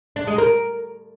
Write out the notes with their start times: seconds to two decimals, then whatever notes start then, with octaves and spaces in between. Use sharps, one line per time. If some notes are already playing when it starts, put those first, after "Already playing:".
0.16 D4
0.27 G#3
0.38 A#4